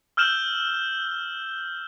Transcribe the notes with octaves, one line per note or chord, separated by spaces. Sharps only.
E6 F6 G6 E7 F#7 G7